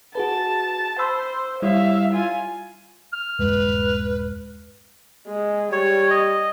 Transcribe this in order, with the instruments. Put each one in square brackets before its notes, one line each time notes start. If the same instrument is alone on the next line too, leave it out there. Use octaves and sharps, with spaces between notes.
[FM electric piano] F#4 G#4 B4 [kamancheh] A5
[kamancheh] C5 [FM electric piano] B5 C6 E6
[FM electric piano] G3 E4 C#5 [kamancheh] E5 F5
[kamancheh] F4 G#5
[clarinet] F6
[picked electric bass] D#1 G2 G#3 [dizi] B4
[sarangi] G#3
[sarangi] G3 [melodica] C#5
[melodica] D#5